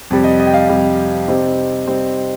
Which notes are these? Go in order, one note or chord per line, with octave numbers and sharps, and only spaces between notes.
F2 C3 G3
D#5
D#5
G5
F5
F2 C3 G3
C3 G3 C4 D#4
C3 G3 C4 D#4